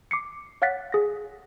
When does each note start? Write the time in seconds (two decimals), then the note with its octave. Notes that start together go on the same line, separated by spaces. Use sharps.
0.11 D6 C7 C#7
0.62 C#5 F5 F#5 F#6 A6 B6
0.92 G#4 A#6